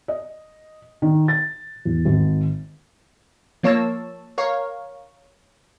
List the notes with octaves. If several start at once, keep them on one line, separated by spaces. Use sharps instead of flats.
D#5
D#3
A6
E2
G#1
F3 A#3 C#5 A5 E6
A#4 C#5 F5